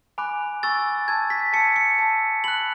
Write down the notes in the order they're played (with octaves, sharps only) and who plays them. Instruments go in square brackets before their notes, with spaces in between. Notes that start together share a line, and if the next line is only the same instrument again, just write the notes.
[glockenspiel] G#5 B5 D6 F#6
G#5 C#6 E6 A6
A5 E6 G#6
B6
A5 E6 C#7
C#7
A5 E6
B5 F#6 F#7